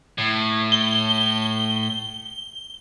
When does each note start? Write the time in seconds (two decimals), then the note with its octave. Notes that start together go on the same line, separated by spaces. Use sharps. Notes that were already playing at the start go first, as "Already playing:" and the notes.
0.18 A2
0.72 G7